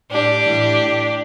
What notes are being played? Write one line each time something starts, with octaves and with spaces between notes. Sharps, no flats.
A2 G3 D4 G4
A2 E3 G3
A2 G3